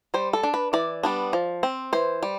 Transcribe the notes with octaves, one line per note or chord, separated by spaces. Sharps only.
G3 C5
A4
D4
B4
E3 D5
G3 B3 D4
F3
C4
E3 C5
G3